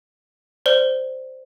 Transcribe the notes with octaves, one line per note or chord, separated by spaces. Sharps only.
C5 D5 G7